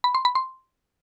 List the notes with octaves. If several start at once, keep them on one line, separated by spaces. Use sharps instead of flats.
B5
C6
B5
C6